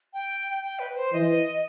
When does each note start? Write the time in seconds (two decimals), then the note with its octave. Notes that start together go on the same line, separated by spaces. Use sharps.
0.13 G5
0.63 G5
0.79 B4
0.96 C5
1.13 E3 D#5